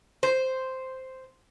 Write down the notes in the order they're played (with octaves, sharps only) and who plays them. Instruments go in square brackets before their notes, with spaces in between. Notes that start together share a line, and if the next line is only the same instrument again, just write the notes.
[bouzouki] C5